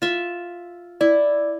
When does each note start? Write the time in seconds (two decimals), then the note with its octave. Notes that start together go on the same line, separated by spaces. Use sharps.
0.02 F4 E5
1.01 E4 D5